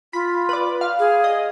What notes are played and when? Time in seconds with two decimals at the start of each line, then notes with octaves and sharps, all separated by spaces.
0.13 F4 B5
0.49 B4 D5
0.81 F5
0.99 G#4
1.24 D#5